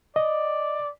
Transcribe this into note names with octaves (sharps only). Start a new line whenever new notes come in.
D5 D#5